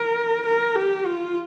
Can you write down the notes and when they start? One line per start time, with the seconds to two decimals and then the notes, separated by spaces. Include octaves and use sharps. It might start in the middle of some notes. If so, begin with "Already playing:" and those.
Already playing: A#4
0.46 A#4
0.76 G4
1.06 F4